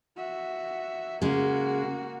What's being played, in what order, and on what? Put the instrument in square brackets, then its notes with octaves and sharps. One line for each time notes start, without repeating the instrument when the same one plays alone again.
[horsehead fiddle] F#4 E5
[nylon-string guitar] C#3 G#3 [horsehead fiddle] A#3 F#4